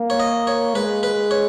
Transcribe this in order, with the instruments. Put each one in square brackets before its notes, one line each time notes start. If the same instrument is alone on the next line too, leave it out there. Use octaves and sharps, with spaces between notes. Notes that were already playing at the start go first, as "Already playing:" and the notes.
Already playing: [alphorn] A#3
[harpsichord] C#5
D#5
C#5
[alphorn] G#3 [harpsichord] B4
[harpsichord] B4
C#5